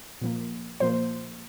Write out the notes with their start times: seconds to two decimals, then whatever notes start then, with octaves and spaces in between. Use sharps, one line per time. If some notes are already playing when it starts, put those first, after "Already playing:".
0.21 A#2 F3 A#3
0.80 A#2 F3 A#3 C5